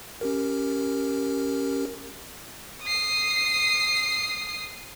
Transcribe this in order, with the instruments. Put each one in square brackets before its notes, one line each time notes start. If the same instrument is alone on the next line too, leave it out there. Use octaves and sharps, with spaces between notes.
[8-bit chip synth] C#4 G4 A#4
[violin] D#6 C7